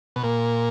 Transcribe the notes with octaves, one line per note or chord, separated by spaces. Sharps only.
B2
A#2